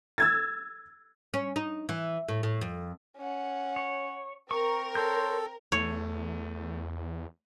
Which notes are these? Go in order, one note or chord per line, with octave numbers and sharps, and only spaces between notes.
E6 G#6 A6
C#4
D#4
E3
A2
A2
F2
C#4 F#5
C#5
C4 A#4 C#6
A4 C#5 C6 G6
E2 A3 C#5